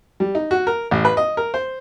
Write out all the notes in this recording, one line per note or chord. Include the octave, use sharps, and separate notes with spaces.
G3
D#4
F#4
A#4
A1
B4
D#5
A#4
C5